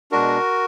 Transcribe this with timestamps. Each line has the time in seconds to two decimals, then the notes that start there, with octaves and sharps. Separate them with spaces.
0.12 B2 G#3 D4 F#4 A#4